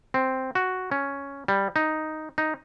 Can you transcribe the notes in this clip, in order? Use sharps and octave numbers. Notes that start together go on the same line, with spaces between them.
C4
F#4
C#4
G3
D#4
D#4